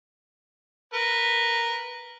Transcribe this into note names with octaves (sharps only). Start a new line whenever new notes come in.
A#4 B4